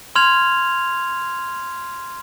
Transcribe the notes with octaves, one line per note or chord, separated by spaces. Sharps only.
C6 F6 G#6 F7